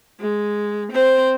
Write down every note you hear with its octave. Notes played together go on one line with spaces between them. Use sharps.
G#3
C4 C5